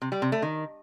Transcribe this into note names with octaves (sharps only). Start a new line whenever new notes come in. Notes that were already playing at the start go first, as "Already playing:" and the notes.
C3
G3
C3
A3
D#3